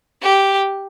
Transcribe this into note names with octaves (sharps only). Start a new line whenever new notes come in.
G4